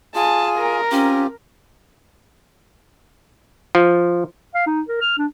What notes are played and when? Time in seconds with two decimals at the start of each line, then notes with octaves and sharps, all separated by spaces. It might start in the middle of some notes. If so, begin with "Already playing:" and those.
0.15 F4 G#4 G#5 A5
0.58 A#4
0.92 C4 C#4 F4 G4
3.75 F3
4.55 F5
4.67 D#4
4.88 A#4
5.02 F6
5.18 D4